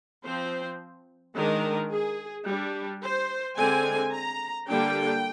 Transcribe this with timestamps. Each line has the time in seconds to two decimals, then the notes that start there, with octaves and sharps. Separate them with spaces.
0.25 F3 C4 C5
1.35 D#3 G#3 D4 A#4
1.91 G#4
2.46 G3 D4
3.02 C5
3.57 D3 G#3 C4 G#5
4.12 A#5
4.68 D3 G3 A#3 D4 G5